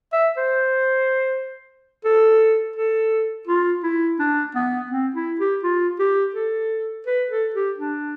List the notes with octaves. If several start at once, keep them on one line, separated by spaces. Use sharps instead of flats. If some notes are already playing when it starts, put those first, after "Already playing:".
E5
C5
A4
A4
F4
E4
D4
B3
C4
E4
G4
F4
G4
A4
B4
A4
G4
D4